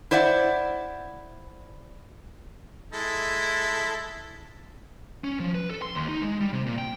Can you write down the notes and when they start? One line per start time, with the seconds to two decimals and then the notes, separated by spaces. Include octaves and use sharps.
0.11 E4 C5 D5 E5 F#5
2.93 G#3 E4 A4
5.24 C#4
5.40 F3
5.55 B4
5.70 A4
5.82 C6
5.95 D#2
6.08 D#4
6.22 G#3
6.41 G3
6.53 C3
6.66 A#2
6.78 G5